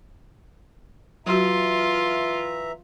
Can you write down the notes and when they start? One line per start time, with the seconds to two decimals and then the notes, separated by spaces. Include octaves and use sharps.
1.27 E3 F#3 F4 F#4 E5 A#5